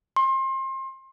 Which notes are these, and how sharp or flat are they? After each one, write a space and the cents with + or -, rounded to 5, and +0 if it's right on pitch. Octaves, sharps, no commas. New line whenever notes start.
C6 +30